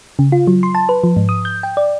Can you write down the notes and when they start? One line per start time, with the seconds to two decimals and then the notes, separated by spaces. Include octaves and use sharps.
0.19 C#3
0.32 F4
0.47 F#3
0.63 C6
0.75 A5
0.89 B4
1.04 F3
1.17 G#2
1.29 D#6
1.45 G6
1.63 G5
1.77 D5